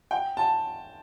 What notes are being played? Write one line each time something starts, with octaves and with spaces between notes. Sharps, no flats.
G5
A5